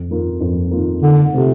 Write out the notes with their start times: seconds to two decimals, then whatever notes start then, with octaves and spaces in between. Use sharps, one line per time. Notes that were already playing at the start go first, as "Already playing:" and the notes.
Already playing: F2
0.10 D#3 A#3 F4 A#4
0.40 F2
0.71 D#3 A#3 F4 A#4
1.02 D3 D#3
1.33 C3 A3 C4 F4 A4